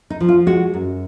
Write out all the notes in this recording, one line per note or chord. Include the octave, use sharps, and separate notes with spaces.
D#4
F3
F4
G#3 F#4
F#2